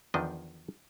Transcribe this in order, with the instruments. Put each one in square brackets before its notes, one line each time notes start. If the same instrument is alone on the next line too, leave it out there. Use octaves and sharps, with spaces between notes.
[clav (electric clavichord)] E2 D#3 F3 D4 D#5